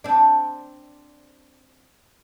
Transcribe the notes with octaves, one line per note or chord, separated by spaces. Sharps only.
C4 D4